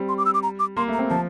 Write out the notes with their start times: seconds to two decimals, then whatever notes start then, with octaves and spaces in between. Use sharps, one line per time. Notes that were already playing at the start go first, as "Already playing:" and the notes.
Already playing: G3 C4
0.09 C6
0.18 D6
0.26 E6
0.34 D6
0.43 A#5
0.59 D6
0.77 A#3 C6
0.88 A3
0.93 A#5
0.99 C4
1.10 F3 A5